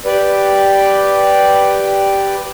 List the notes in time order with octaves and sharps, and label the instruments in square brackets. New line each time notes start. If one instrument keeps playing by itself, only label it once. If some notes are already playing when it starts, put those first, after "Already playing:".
[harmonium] G4 B4 D5